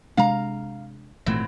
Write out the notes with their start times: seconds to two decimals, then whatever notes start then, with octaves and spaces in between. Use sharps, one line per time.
0.17 C3 G#3 D4 F5 A#5
1.26 G#1 A#2 E3 F#3 A3 C4